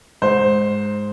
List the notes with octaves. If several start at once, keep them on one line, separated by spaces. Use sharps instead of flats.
G#2 C5